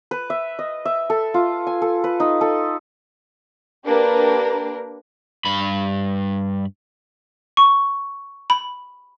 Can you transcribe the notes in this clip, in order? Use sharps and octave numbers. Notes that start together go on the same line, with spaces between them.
B4
E5
D#5
E5
A4
F4
G#5
A4
B4
D#4
A4
A#3 D4 G4 A#4 B4
G2 B5
C#6
B5